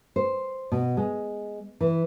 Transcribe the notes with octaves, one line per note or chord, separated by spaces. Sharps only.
C5
B2
G#3
E3